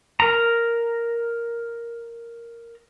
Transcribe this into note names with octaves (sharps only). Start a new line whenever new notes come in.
A#4 A#5